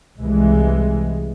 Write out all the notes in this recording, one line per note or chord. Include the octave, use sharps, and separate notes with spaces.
C2 E3 G#3